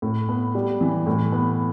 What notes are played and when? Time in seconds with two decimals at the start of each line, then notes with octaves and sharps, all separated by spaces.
0.02 A2
0.29 B3
0.55 G3
0.81 E3
1.07 A2
1.32 B3